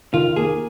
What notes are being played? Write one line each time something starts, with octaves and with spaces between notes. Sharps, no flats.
D#3 F4
A#3 G#4